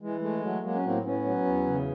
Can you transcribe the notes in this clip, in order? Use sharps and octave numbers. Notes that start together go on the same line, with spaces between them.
E3 G#3
G#3 A3
F#3 A3
F#3 G#3 A#3
C#4
A2 A#3 C4
A2 B3 C#4
F#3
E2
C#3